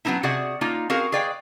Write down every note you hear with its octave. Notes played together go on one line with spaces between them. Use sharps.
F#3 B3 C4 D#4 E4
C3 F#4 G#4 D5 F#5
A#3 D#4 F4 F5
C4 F#4 G#4 A#4 F5
G#4 B4 D5 F5 G5